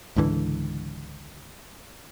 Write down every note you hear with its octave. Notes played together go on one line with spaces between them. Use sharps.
C#2 G#2 D3 E3